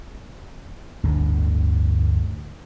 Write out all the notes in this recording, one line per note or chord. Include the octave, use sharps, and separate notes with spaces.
G1 D2 A2 D3